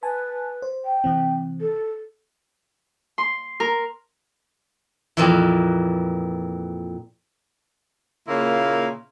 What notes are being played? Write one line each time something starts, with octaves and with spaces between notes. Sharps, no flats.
B4 G#5 A5
C5
G5
C3 E3 C4
A4
C6
A#4
F2 A#2 E3
A#2 C#3 A#3 E4 F5 C6